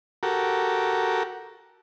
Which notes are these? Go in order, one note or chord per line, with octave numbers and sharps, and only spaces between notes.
F#4 G4 A4 A#4